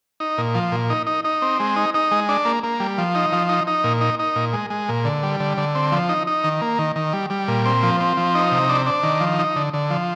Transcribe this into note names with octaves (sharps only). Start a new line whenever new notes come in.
D#4
A#2
F3
A#2
D#4
D#4
D#4
C4
G#3
D#4
D#4
G#3
D4
A#3
A#3
G3
F3
D#4
F3
D#4
D#4
A#2
D#4
D#4
A#2
G#3
G#3
A#2
D3
G3
D3
D3
C4
F3
D#4
D#4
D#3
A#3
D#3
D#3
G3
G3
A#2
C4
F3
C4
F3
D#4
C3
D4
D4
D#3
F3
D#4
D3
D3
F3